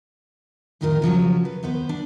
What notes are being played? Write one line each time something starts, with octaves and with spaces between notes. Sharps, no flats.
F2 A2 D#3 F4 A4 A#4
C#3 F3 F#3 C#4
B4
D#2 B3 B4 C5
D4